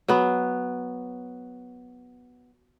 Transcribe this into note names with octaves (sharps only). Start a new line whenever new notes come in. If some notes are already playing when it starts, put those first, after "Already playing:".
F#3 B3